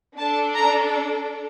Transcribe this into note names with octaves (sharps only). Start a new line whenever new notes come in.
D4 A4 A5
A#5